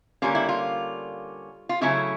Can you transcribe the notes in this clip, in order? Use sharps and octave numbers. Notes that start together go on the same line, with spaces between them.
D3 G3 A#3 C#4 F4
E4
F4
F4
C#3 F#3 A3 C#4 E4